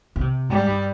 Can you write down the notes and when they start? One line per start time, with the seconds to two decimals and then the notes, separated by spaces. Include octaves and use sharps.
0.16 C#3
0.21 C3
0.49 G#2 G3
0.68 G2